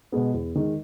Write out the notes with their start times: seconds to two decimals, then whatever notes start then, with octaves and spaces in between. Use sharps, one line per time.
0.12 B2 G#3 B3
0.34 E2
0.55 D#3 G#3